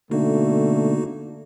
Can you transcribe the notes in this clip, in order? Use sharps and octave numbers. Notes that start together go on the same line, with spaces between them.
B2 D3 A3 A#3 D#4 F#4